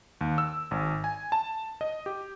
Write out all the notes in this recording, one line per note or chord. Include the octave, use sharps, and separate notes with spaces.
D#2
E6
G#1
G#5
A5
D#5
G4